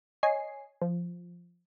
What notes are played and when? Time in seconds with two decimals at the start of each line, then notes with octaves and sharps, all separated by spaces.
0.23 C#5 D#5 G#5 C7
0.81 F3